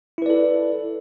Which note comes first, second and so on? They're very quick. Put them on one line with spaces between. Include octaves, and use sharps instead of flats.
E4 B4 D5 A4